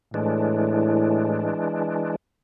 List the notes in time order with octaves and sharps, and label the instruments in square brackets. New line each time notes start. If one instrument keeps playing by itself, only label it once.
[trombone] A2 [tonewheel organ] E3 G#3 D4